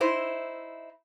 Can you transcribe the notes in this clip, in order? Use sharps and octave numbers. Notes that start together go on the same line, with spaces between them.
D#4 E4 C5